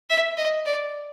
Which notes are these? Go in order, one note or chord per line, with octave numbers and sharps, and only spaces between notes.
E5
D#5
D5